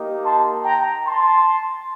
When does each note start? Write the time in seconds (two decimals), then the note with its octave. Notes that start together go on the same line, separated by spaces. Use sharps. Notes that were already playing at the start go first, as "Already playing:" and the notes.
Already playing: A#3 D#4 G4
0.24 A5 C6
0.65 G5 A#5
1.06 A5 C6